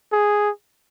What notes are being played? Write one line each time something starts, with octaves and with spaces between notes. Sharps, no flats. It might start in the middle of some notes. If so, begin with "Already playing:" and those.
G#4